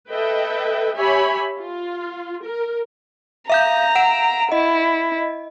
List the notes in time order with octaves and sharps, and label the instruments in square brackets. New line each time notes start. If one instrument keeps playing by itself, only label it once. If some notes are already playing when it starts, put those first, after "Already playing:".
[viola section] A4 B4 D#5 E5 G5
G4 C#5 E5 G#5 B5
F4
A#4
[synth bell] E5 F5 G6 [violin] A#5
[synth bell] F#5 D7 E7
[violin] E4 [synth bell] D#5